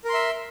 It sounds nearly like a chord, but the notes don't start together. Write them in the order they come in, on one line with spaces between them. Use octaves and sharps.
A#4 C6 E5